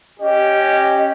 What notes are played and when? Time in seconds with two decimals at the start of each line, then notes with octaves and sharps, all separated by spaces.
0.20 C#4 G4 D#5